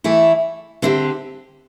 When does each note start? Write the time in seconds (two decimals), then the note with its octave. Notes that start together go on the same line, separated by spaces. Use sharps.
0.04 E3 A3 E4
0.82 D3 C4 E4 G4